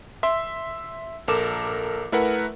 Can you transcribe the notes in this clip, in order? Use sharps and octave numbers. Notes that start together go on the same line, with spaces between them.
E5 C6 E6
A#1 A4 A#4 D6 E7
A3 E4 A#4 B4 E5 F#5